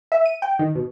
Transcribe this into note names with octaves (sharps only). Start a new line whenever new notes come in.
E5
D#7
G5
D#3
B2